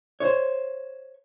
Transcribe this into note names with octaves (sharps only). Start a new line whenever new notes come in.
C5 C#5